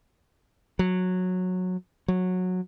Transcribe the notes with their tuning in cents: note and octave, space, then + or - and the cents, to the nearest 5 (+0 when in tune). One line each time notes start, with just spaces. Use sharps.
F#3 -15
F#3 -15